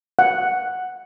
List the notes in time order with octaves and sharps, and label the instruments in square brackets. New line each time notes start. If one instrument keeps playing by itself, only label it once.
[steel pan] F#5